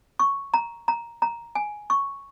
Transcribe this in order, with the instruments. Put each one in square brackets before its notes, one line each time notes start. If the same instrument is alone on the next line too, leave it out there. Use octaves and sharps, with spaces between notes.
[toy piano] C#6
A#5
A#5
A#5
G#5
C#6